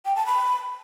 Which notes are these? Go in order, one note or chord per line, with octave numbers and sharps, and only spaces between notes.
G5
A5
B5